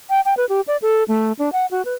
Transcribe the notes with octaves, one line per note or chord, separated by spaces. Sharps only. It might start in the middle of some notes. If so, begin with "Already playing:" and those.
G5
G5
B4
G4
D5
A4
A3
D4
F#5
F#4
B4